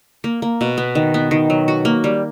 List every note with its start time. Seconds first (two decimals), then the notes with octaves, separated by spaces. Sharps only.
0.24 A#3
0.42 A#3
0.61 B2
0.78 B3
0.95 D#3
1.14 B3
1.31 D#3
1.50 F#3
1.68 F#4
1.85 A#3
2.04 G3